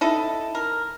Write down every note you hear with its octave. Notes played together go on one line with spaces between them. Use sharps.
D#4 E4 A4
A#4